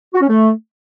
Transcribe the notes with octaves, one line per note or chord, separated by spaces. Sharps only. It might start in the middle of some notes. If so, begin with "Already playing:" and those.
F#4
C#4
A3